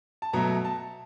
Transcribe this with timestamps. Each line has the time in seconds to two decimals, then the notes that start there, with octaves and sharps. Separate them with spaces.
0.22 A5
0.33 B2 F#3 A3 A#5
0.65 A5